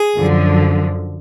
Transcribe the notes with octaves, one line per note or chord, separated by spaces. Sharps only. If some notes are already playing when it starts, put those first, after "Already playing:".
Already playing: G#4
F#2 D3 F3